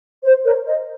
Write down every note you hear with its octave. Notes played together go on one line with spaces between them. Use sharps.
C5
A#4 C#5
C5 D#5